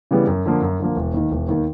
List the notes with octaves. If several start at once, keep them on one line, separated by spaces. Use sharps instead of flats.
C#3 E3 G3 B3
F#2
D3 F3 A#3
F#2
D3 F3 A#3
E1
D#2 D#3
E1
D#2 D#3